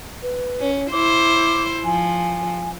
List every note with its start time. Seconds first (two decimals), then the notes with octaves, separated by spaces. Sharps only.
0.23 B4
0.60 C#4
0.92 E4 C5 D6
1.84 F3 G#5